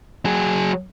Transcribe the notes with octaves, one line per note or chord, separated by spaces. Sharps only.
F#3 G#4